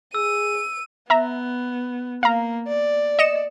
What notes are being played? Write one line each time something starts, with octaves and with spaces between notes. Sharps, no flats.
G#4 E6 D#7
B3 E5 A#5
A#3 F5 A#5
D5
D#5 C#7 E7